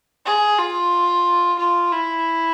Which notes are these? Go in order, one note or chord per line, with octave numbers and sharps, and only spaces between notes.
G#4
F4
F4
E4